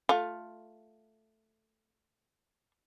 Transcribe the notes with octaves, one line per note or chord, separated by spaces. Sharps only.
A3 F4